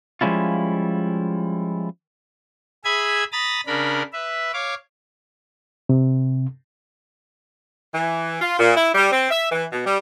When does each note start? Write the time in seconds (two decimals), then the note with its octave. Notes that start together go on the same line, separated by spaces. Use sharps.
0.21 F3 G3 G#3 C#4 E4 F4
2.85 G#4 E5 G#5 B5 G#6
3.32 A#5 B5 D#6 A6
3.67 C#3 D4 A#4 B5
4.13 B4 E5
4.53 C#5 F5 D6
5.89 C3
7.95 E3
8.41 F4
8.59 A#2
8.75 E4
8.95 G3
9.12 C4
9.30 E5
9.52 E3
9.73 B2
9.86 G3